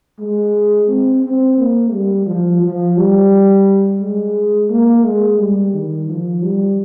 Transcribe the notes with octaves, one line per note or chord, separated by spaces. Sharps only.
G#3
C4
C4
A#3
G3
F3
F3
G3
G#3
A#3
G#3
G3
D#3
F3
G3